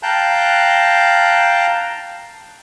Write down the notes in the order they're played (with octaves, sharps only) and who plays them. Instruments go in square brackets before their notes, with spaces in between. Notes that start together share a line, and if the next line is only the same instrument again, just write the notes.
[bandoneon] F5 G5 A5 A#5 F#6 G6